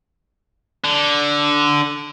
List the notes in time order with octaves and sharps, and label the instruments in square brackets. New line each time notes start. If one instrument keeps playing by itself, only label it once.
[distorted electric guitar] D3